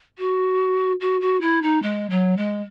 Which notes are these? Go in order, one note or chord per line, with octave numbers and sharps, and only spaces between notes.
F#4
F#4
F#4
E4
D#4
G#3
F#3
G#3